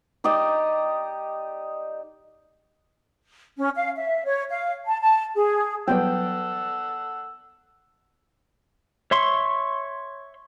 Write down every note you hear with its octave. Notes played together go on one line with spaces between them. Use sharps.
D#4 G4 D5 D#5
C#4
F5
E5
C#5
F5
A5
A5
G#4
F#3 G3 B3 A4 F#5 G5 E6
C#5 E5 C6 C#6